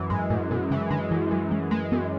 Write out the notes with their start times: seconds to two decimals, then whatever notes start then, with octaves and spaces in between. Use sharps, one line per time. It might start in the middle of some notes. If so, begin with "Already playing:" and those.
Already playing: F#2 E3
0.10 G#2 G#3
0.30 F#2 A2
0.51 F#2 B2
0.70 C#3 E3
0.91 D3 G#3
1.11 F#2 E3
1.31 F#2 F#3
1.51 E3 G#3
1.71 G#3 A3
1.92 F#2 B3